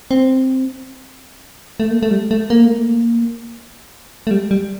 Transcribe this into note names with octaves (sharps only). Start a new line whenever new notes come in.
C4
A3
A#3
A3
G3
A3
A#3
A3
A#3
A3
G3
G3